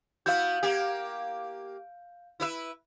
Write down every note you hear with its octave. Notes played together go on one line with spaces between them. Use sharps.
B3 E4 F#4 F5 G6
A#3 G4
E4 B4 E5